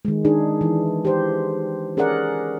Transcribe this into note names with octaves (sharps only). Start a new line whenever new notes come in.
D#3 G#3
D4 D#4 G#4
E3
G4 C5
C#4 G#4 A#4 D5 F#5